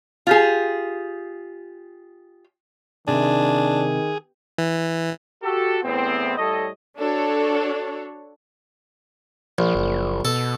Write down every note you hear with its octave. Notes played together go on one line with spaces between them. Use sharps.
F4 G4 G#4
C3 D#3 D4 G#4
E3
F#4 G4 A4
E2 A2 B3 C4
A2 G3 A4 C#5 D#5
D4 F#4 A4 C#5
A#1 F3
F#1
B2 A4